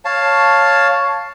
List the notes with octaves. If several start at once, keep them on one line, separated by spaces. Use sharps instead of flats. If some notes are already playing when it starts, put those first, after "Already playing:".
C#5 F5 A5